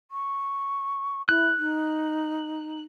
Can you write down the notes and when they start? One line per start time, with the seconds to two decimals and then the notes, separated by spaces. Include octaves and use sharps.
0.11 C#6
1.29 E4 F#6
1.58 D#4